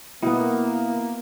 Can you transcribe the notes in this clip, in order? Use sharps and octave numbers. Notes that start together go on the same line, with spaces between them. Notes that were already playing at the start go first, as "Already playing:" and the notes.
B2 A#3 B3 E4